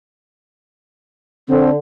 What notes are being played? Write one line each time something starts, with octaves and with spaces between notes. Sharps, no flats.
D3 C4